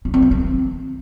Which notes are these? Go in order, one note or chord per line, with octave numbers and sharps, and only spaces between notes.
C#4
C4
E3
C4